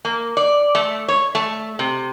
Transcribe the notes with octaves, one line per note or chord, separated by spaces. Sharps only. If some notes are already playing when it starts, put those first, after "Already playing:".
A#3
D5
A3
C#5
A3
C3